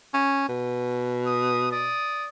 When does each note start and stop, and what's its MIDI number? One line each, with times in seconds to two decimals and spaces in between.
0.14 0.45 61
0.49 1.96 47
1.26 1.68 87
1.72 2.29 74
1.72 2.29 87